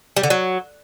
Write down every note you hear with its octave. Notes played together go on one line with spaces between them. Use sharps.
G3
D3
F#3